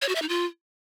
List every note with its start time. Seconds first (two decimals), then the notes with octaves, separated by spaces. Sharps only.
0.02 C#5
0.09 F#4
0.15 E5
0.22 D#4
0.29 F4